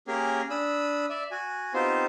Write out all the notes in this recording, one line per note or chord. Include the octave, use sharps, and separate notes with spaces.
A#3 C#4 G4 G#4 A#4
D4 B5 D#6 E6
D5 E5
F#4 G#5
B3 C4 D#4 F4 G4 C5